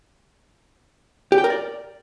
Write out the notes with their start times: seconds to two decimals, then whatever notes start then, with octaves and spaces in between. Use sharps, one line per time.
1.32 G4
1.38 G5
1.44 A#4
1.50 D5